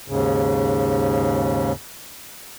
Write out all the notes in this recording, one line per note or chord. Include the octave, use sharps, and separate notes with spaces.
D#2 G#2 C#3